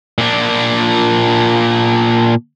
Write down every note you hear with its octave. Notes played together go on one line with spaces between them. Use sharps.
A#2 D4